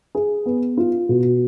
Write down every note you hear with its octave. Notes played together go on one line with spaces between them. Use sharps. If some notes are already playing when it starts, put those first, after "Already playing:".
G#4
B3
F4
B2